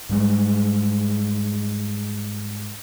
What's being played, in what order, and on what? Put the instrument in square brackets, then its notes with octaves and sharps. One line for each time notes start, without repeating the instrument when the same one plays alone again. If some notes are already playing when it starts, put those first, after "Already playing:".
[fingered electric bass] G#2 G3 G#3